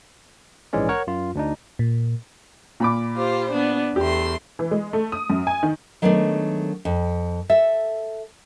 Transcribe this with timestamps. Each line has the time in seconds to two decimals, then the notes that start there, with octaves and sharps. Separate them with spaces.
0.73 A#1 G#2 E3 G#3 C#4 D5
0.89 A#4 C#5 F#5
1.07 F#2 F4
1.35 D2 D4 D#4
1.79 A#2
2.80 A#2 B5 D6
3.15 F4 G4 C5
3.51 B3 D4
3.96 E2 A3 G4 C6
4.59 E3
4.71 G#3
4.93 A3
5.12 D#6
5.30 F#2
5.47 G#5
5.63 D#3
6.02 D#3 F#3 G#3 A3 B3 D4
6.85 F2
7.49 A4 E5